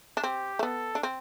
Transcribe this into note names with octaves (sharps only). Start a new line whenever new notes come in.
D4
C4 G4
A3
B3 A4
D4
C4